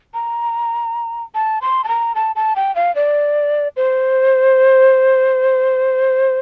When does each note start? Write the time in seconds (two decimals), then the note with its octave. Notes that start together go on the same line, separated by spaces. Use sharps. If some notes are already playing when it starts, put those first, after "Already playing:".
0.14 A#5
1.35 A5
1.62 C6
1.84 A5
1.88 A#5
2.15 A5
2.35 A5
2.56 G5
2.75 F5
2.95 D5
3.76 C5